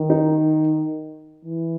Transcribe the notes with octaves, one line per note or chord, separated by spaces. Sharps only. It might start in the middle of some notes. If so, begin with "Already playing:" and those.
Already playing: D#3
D#4
E3